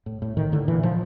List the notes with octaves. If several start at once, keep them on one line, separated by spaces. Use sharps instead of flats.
A2
A2
A2 D#3
A2 D3
A#2 E3
A#2 F3